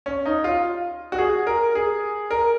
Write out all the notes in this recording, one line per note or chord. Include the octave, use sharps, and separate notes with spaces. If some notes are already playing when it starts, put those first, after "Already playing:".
C#4
D#4
F4
F#4
G#4
A#4
G#4
A#4